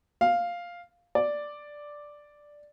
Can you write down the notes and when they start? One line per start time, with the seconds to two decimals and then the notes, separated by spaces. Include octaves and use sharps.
0.21 F5
1.15 D5